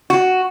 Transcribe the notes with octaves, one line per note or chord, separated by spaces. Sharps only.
F#4